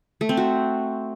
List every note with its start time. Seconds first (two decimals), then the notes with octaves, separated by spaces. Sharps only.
0.21 A3
0.29 C4
0.37 F#4